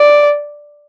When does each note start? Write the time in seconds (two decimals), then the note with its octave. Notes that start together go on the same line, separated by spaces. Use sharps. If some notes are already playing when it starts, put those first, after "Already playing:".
Already playing: D5